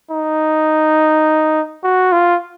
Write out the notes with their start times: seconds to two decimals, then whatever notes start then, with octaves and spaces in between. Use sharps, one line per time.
0.11 D#4
1.84 F#4
2.12 F4